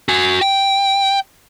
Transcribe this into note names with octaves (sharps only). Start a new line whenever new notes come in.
F#4 G#5
G5